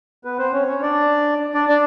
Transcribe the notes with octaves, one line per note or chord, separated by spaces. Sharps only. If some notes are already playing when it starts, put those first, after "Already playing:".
B3 B4
C4 C5
C#4 C#5
C#4 C#5
D4 D5
D4 D5
D4 D5